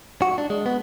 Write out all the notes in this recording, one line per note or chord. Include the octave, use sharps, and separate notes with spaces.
F#4
D4
G#3
B3